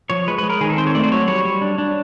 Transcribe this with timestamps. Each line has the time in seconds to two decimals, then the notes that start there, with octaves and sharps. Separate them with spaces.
0.10 F3 C#5
0.28 G#3 B4
0.38 G#3 B4
0.50 A#4
0.61 D#3 G#4
0.70 A4
0.77 C4 C5
0.87 C#5
0.94 A3 D5
1.03 C5
1.11 F#3 C#5
1.28 G3 C#5
1.45 G3
1.62 D4
1.78 D4